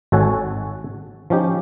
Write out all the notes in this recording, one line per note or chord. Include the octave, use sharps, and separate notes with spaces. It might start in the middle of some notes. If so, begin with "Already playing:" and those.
G#1 F#4 A4 C#5 F#5 G#5
F3 C#4 D#4 G4